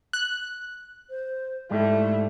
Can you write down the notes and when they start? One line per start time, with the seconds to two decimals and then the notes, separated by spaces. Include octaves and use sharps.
0.13 F#6
1.10 C5
1.71 G#2 G3 A3 E4